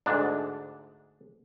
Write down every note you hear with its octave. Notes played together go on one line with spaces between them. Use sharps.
D2 G#2 D4